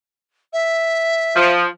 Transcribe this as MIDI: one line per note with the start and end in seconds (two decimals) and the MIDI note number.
0.53 1.52 76
1.36 1.66 53